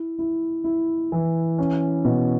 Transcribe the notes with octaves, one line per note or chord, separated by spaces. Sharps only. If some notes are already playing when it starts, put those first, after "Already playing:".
Already playing: E4
E4
E4
E3
C#4
B2